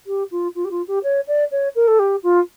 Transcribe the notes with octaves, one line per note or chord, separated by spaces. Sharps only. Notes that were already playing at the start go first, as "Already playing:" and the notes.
G4
F4
F4
G4
F4
G4
C#5
D5
C#5
A#4
A4
G4
F4